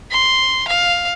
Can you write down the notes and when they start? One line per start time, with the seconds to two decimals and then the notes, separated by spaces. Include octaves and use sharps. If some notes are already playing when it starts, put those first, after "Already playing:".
0.11 C6
0.68 F5